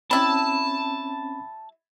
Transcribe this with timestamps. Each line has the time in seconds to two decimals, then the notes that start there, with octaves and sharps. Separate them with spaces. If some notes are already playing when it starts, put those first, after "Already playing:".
0.11 G3 C4 C#4 E4 A5 B5